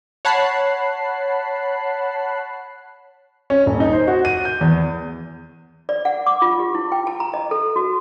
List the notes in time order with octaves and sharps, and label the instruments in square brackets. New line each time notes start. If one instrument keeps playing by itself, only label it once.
[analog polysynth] C#5 F#5 A5 B5 F#6 C7
[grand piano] C#4
D#1
D#4
C5
F#4
D#7
G6
E2
[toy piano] D5
F#5
D6
F4
G4
E4
G5
A5
A#5
D#5
A4
F#4